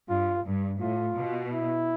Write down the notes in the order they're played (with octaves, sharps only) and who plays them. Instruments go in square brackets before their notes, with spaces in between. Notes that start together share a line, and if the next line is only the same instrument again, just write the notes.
[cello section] G2 [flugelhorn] F4
[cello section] G2
[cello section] A2 [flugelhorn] F4
[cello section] B2
[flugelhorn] E4